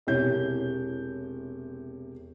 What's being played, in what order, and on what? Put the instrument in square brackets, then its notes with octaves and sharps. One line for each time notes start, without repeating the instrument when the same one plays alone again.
[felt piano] E1 C3 E4 C#5 G6